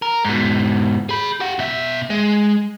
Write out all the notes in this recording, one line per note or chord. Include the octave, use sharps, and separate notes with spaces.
A#4
G#2 B2
G#4 B5
G4 F#5
B2 E5
G#3